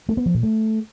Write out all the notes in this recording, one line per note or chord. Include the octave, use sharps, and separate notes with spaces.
A3
B3
F3
A#2
A3